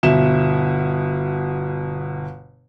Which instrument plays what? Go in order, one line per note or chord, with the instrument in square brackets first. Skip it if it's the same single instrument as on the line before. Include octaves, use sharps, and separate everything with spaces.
[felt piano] G1 B2 E5 E7